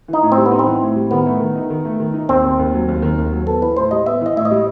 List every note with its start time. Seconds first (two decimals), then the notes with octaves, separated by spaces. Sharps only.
0.08 E3 D#4
0.22 A2
0.32 C4
0.37 G3
0.46 B3
0.51 D#4
0.59 C4
0.66 E3
0.82 A2
0.96 G3
1.11 D#3 B3
1.26 A3
1.40 D#3
1.55 D#4
1.70 D#3
1.85 A3
2.00 D#3
2.14 D#4
2.29 D#2 C4
2.44 D#3
2.59 D#2
2.74 F#3
2.88 D#2
3.02 D#3
3.18 D#2
3.32 F#3
3.46 B3 A4
3.61 E3 B4
3.76 A2 C5
3.91 G3 D#5
4.05 B3 E5
4.21 E3 D#5
4.36 A2 E5
4.45 D#5
4.51 G3